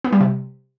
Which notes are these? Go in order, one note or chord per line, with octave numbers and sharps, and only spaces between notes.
B3
G3
C3